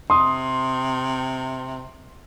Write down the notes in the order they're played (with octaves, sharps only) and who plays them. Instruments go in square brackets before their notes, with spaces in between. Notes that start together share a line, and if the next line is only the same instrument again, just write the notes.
[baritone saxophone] C3 [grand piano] C6 D#6